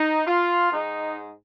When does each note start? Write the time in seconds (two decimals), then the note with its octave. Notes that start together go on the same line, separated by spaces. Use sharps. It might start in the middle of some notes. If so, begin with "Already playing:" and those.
Already playing: D#4
0.26 F4
0.70 G#2 G#3 D#4